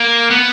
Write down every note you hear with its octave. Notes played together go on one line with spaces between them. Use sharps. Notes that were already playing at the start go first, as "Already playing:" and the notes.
Already playing: A#3
B3